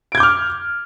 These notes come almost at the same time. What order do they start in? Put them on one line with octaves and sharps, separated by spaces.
D7 G#6 G6 D6 F6